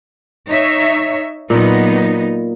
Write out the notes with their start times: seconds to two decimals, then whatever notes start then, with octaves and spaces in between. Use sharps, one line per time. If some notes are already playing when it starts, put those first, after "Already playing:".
0.49 D#4 C#5 E5
1.50 A#2 F#3 B3 D#4